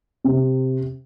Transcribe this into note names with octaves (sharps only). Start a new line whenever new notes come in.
C3